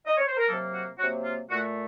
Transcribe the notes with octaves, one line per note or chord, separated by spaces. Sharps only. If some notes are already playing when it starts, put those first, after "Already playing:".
D#5
C#5
C5
A#4
C3 F#3 A#3 A4
F#4
C3 F#3 A#3 F#4
F4
A#2 A3 F#4